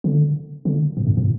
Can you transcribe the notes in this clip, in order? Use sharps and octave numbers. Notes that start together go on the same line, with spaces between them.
D3
D3
A2
G2
A2